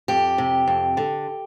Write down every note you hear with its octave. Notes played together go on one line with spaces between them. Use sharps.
F2 G4
C3
F2
D3